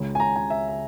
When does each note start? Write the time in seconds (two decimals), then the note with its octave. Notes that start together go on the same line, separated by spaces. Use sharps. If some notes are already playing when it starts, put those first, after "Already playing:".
Already playing: C#2 C#3 G#3
0.15 G#5
0.20 A#5
0.36 G#5
0.50 E5
0.68 E5